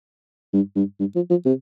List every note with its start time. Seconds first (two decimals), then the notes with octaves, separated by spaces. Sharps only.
0.53 G2
0.76 G2
0.99 G2
1.15 F3
1.30 F3
1.45 C3